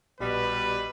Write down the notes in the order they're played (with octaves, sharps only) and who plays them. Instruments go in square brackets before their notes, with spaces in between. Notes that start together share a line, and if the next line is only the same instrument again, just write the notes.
[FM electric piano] A#1 G4 D#5 [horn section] B2 G3 [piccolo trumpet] B4